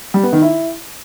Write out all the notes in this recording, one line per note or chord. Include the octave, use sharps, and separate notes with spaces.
G3
B3
D#3
E4